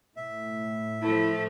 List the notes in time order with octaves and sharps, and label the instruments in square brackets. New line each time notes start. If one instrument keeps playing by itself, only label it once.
[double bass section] A2 [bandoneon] E5
[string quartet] F3 A3 [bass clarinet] E4